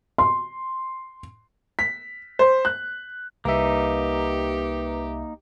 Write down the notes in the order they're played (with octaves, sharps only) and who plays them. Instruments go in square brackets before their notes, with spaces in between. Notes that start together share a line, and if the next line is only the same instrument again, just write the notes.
[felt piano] C6
[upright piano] B6
C5
F#6
[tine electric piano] C2 E5 [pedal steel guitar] A#3 D#4 [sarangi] G4 [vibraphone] B4